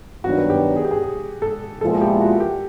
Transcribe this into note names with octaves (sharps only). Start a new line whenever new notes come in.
G2 D#3 F#3 B3 D4 F#4
G4
G#4
G4
G#4
G#4
A4
A#2 F3 G#3 B3 E4 A4
G4
F#4
G4